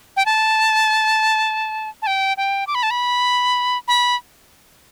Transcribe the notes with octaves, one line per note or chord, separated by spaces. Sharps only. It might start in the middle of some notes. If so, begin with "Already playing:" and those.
G5
A5
A5
G5
G5
D6
B5
A5
B5
B5